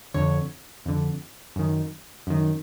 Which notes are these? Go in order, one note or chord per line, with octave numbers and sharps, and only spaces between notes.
F2 D3 C#5
F2 D3
F#2 D#3
F#2 D#3